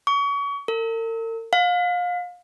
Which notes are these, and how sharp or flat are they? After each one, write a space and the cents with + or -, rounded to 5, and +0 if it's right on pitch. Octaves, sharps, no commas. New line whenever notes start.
C#6 +35
A#4 -45
F5 +30